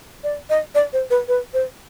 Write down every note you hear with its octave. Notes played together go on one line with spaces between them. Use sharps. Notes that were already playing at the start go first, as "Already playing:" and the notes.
D5
D#5
D5
C5
B4
B4
C5